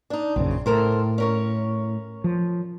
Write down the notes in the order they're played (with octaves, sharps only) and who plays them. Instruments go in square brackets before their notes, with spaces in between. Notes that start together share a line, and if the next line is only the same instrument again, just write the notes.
[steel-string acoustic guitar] D4 D#4
[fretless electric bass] A#1 F#2 C#3 [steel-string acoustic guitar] C4
[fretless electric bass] A2 [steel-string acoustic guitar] A4 A#4 C5
[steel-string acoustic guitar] C#4 A#4 C#5
[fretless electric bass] F3